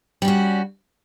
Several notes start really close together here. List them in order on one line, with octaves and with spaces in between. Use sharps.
G3 C#4 F#4